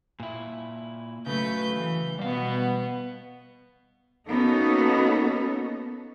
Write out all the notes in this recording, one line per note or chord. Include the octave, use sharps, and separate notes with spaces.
A#2 E4
C#3 F#3 A3 B4 G6
E3
B2 G3 B3 F5
A#3 B3 C#4 D#4 F#4 A4